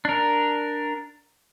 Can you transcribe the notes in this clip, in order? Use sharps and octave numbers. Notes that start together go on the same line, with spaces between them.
D4 A#4